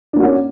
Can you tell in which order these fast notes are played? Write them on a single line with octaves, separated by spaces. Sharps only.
D4 A#3 F#4 C#4